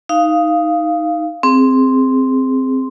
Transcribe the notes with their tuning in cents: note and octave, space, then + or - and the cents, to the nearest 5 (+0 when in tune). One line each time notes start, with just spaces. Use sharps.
D#4 +5 F5 -10
C4 +0 G#4 +0